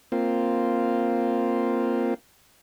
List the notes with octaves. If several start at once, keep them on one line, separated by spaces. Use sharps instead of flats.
A#3 C4 F4